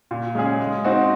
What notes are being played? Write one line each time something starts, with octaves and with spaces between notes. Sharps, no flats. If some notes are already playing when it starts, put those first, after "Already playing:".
A#2
G#3 C#4 G#4
G#3
C4 D#4 F#4